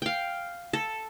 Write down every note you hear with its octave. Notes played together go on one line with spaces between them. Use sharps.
F5 G5
A4